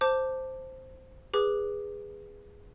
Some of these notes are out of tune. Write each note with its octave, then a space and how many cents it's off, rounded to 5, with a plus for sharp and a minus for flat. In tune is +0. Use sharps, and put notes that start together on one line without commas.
C5 +0 A5 +15 D6 +0
G#4 -15 B4 -5 D6 +0